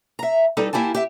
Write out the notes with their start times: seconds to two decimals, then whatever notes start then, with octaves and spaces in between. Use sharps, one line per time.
0.19 E5 A#5
0.57 G3 D#4 A4 B4
0.73 A#3 E4 G4 G#5 A5
0.95 G4 E5 G5